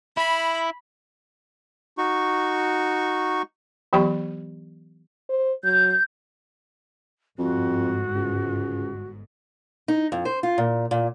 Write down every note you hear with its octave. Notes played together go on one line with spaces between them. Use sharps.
E4 B5
D#4 F#4 C#6
E3 F#3 B3 G4 B5 C#6
C5
F#3 G6
G1 F2 G#2 F#4
C#2
D#4
F2
C5
F4
A#2
A#2